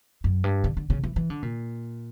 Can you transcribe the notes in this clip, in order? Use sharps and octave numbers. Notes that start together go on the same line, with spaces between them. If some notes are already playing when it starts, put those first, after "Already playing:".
F#2
G2
D3
D3
C#3
E3
E3
D3
A#2